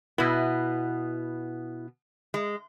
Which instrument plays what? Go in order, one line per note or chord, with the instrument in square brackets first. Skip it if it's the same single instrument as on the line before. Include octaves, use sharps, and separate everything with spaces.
[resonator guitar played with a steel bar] B2 B3 [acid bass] E4
[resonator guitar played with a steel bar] G#3